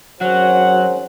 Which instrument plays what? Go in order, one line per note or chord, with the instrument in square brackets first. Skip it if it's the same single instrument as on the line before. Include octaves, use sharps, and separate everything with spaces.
[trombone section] G#1 C#4 F#4 [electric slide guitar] F#3 [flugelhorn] C5 [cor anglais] F#5